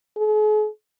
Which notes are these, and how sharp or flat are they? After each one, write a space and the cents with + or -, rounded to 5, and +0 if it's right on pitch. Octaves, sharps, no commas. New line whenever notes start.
G#4 +45